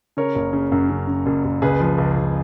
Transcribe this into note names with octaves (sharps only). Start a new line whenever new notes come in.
C#3 A#4 C#5
F#1
C#3
F#2
C#3
C#3
F#1
F#1
C#2 G#4 B4
F3
C#2
C#2